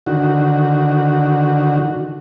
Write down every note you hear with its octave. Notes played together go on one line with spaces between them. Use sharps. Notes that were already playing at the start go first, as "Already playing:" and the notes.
D3 D#3 F#4